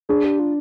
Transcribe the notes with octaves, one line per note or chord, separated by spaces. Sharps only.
D4 G#4
G4
F4